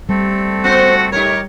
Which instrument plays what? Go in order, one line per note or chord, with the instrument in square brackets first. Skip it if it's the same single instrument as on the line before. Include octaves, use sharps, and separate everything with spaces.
[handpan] G3 [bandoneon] A3 C4 A4
[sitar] B3 C5 [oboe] F#4
[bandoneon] A3 [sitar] D#4 G4 A#4 [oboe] C#5